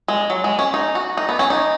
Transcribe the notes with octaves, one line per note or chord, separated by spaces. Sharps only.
G#3
F#3
G#3
C#4
D#4
F#4
D#4
B3
C#4
D#4